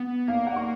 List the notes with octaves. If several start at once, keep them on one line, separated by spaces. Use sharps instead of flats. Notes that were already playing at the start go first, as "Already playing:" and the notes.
Already playing: B3
A#3 F5
F#5
C#6